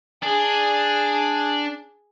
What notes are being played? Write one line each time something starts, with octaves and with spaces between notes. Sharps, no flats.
D4 G#4